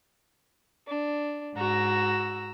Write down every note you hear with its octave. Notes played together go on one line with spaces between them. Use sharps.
D4
G#2 F#4 A#5 E6